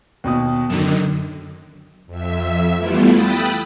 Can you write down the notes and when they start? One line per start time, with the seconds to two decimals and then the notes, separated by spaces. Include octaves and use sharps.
0.24 D#2 B2 D#6
0.70 F#2 D3 D#3 E7
2.06 F2 E5
2.76 E3 G3 A3 B3 E4 F4
3.11 G5 B5 D#6 E6 F#6 A6